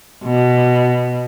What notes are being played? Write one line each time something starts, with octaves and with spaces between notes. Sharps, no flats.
B2